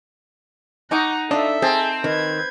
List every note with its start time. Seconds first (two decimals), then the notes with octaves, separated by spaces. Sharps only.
0.91 D#4 F#5 G#5 A#5 C#6 D6
1.31 D4 F4 A4 D#5 E5
1.62 C4 G#4 A#4 A5
2.04 D#3 B4 G#6